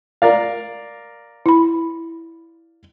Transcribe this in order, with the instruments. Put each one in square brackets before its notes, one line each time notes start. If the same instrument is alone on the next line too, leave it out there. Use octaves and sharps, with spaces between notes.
[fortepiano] A#4 D5 F5
[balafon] E4 B5